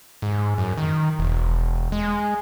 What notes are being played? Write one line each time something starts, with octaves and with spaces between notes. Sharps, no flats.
G#2
F#2
D#3
E1
G#3